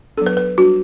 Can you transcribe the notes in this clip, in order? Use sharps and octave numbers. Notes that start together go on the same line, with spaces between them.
F#3 B3 D4 A4
B4
B4
G3 D4 F#4